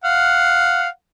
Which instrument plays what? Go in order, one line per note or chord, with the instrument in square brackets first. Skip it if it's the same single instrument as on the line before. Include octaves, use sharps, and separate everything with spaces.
[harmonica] F5 F#5